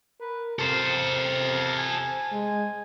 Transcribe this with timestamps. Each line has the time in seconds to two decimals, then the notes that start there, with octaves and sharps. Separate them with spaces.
0.21 A#4 B4
0.59 C3 A4 A#4 C5
1.77 G#5
2.33 G#3